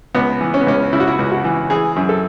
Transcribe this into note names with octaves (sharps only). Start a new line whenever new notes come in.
C#2 B3
E3
C#4
B3
C#2 C#4
C#3 E4
F#4
E4
C#2
F#4
E3
E3 G#4
F#2
A4